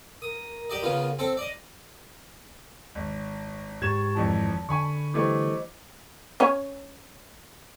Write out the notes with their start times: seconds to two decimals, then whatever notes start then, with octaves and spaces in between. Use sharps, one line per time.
0.22 A#4 D#6
0.70 G4 D5 D#5
0.82 C#3 B3 F4
1.19 C4 A4 A5
1.37 D5 D#5
2.95 G#1
3.82 G#2 G4 C#6 G#6 A6 E7
4.15 G#1 F2 E3 A5
4.69 D3 G#5 B5 C#6
5.14 E3 G3 A3 C5 D#5 D6
6.40 C#4 C#5 G#5